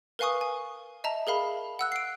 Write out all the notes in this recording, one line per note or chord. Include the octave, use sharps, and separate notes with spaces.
A#4 B4 F5 G#5 C#6 D#6
G#5
D#5 E5 A5 A#5
G#4 A#4 F5 B5
F#5 E6 F#6
C7 D7